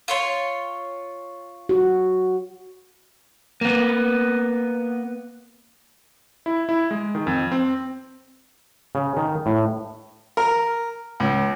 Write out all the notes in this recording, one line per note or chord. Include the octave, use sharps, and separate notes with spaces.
F4 C#5 C6
F#4
A#3 B3
E4
E4
G#3
D#3
F2
C4
C#3
D#3
A2
A#4
C#2